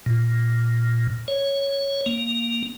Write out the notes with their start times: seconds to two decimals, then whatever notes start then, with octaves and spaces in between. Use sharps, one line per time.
0.06 A#2
1.28 C#5
2.06 A#3